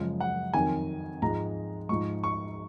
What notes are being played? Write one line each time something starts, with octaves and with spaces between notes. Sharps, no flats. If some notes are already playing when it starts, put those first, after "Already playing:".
Already playing: F#2 C#3 F3 G#3
F#5
F2 D#3 F#3 G#5
G#2 F3 G#3 A#5
G#2 F3 G#3 C#6
C#6